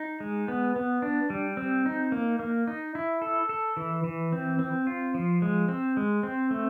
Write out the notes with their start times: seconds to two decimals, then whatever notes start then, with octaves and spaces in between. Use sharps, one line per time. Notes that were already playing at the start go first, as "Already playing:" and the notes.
Already playing: D#4
0.20 G#3
0.48 B3
0.76 B3
1.02 D4
1.30 G3
1.57 C4
1.86 D#4
2.12 A#3
2.39 A#3
2.67 D#4
2.95 E4
3.22 A4
3.49 A4
3.77 E3
4.04 E3
4.32 C4
4.59 C4
4.87 F4
5.14 F3
5.42 G#3
5.68 C4
5.97 G#3
6.23 C4
6.51 A3